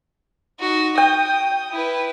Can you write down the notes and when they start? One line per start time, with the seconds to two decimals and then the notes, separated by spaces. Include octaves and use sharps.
0.59 D#4 F#4
0.98 G5 D#6
1.71 E4 B4